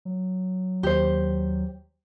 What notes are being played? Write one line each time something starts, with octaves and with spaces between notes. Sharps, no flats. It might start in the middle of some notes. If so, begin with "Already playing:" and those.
F#3
D#2 G4 C5